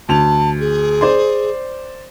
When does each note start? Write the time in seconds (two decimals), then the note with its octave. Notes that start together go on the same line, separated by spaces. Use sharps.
0.09 D2 A5 F7
0.60 G#4
1.01 C5 D5 C6